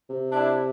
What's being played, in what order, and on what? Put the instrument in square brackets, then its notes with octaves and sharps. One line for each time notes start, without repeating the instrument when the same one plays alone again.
[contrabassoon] C3
[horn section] D4 E4